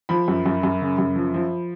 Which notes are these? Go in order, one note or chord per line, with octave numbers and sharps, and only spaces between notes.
F3 B5
F#2
F#2
F#2
C#3
F#2
F3
F3